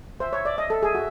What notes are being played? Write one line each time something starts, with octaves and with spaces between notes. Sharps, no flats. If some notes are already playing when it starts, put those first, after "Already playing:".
C5 E5
C#5
D5
D#5 E5
A4
G#4
F#4